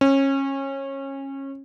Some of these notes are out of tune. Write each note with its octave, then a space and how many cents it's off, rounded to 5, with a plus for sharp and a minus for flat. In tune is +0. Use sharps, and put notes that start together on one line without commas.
C#4 -25